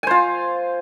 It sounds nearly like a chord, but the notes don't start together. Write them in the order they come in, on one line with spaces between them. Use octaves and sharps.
G#5 C5 F4